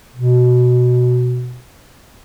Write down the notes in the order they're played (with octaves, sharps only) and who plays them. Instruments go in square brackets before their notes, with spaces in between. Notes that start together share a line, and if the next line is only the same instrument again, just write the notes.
[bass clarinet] B2